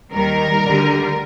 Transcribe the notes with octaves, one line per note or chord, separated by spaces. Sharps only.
D#2 D#3 G3 A#4
D2 D3 G3